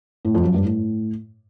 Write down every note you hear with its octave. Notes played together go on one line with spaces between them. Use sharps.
A2
F2
F#2
G2
A2